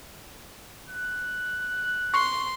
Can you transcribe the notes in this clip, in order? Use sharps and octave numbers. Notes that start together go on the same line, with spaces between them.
F#6
C6 C#6